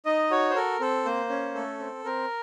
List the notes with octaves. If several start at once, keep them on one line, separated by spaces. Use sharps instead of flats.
D#4 D#5
F#4 C#5
C5
A4 A#4
C4 A4
A#3 C5
C#4
A3 A4
C4
C4 A#4